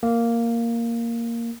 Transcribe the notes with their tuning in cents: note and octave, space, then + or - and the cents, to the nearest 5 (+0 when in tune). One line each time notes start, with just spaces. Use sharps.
A#3 -5